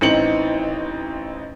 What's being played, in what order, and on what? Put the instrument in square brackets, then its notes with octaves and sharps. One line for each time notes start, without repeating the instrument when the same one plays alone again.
[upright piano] A1 E3 C4 D#4 C#7 F#7